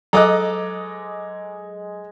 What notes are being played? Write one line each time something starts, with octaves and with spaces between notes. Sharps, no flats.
F#3 G#3 A4 D#5 A#5 D6 F#6